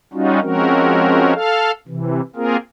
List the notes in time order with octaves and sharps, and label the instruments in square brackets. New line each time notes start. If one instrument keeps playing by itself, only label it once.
[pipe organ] G3 C#4 D#4 F4 F#4
F3 G#3 C4 C#4 F#4 A#4
A4 F5
C3 E3
A#3 C4 F4 G#4 A#4